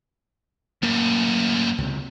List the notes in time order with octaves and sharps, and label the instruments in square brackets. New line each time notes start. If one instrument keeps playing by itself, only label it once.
[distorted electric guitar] F#2 A2 [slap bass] A#3
[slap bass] C#2 C3